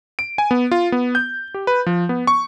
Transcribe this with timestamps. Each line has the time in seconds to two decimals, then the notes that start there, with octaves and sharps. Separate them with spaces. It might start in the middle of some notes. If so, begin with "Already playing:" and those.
0.19 D7
0.38 G#5
0.51 B3
0.71 F4
0.92 B3
1.15 G6
1.54 G4
1.67 B4
1.86 F3
2.09 B3
2.27 C#6